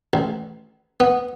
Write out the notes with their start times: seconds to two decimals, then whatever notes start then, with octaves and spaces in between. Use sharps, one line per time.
0.13 A1
1.00 B3